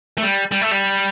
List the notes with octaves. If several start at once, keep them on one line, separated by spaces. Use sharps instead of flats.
A3
G3
G3
A3
G3